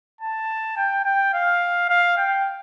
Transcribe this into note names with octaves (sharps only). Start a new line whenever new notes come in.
A5
G5
G5
F5
F5
G5